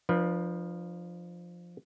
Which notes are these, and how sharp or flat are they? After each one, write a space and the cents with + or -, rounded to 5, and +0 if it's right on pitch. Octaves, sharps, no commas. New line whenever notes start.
F3 +0 D4 +40 B4 -30